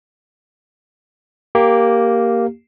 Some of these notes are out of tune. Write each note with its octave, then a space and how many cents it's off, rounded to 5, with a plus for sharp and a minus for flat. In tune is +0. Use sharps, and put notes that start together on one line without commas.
A#3 +0 G4 +0